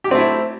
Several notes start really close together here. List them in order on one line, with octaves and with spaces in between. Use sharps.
G4 F#3 C4 A3 E4